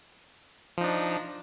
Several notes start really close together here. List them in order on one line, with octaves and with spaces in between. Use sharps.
F3 D#4 D4